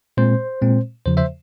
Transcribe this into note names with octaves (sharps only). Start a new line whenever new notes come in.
A#2 G#3 C4 C5
A#2 G#3 C4
E2 C#3 F3 C5
C5 E5